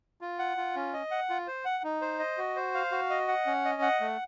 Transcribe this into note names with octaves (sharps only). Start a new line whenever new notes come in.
F4
F#5
F4
C#4
D#5
F#5
F4
C5
F#5
D#4
C5
D#5
F#4
C5
F5
F#4
D#5
F#5
C#4
D#5
F#5
A3